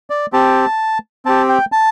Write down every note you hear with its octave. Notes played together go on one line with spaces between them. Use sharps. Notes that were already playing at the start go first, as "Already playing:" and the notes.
D5
C4 G4 A5
C4 G4 A5
G5
A5